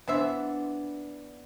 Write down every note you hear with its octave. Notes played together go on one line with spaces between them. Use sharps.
E3 B3 D4 C5 E5